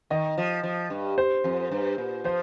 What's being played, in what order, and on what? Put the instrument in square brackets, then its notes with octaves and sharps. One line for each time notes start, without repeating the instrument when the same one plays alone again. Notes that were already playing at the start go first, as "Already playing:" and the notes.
[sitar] D#3 [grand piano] D#5
[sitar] F3
F3
G2
[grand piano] C5
[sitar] F2
G2
A#2
[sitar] F3 [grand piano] C5